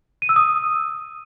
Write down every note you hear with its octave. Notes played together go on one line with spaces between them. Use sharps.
D#7
E6
D#6